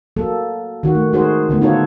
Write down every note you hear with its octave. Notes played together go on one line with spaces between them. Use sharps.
F#3 A#3 A4
D#3 F#4
A3
G#3 D#4 F#4 G#4 A#4 C5
D3 A3 B3
D#4 F4 F#4 A4 C5 C#5